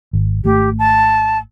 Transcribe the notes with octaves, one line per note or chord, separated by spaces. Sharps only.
G#1
G#1 A3 G4
A5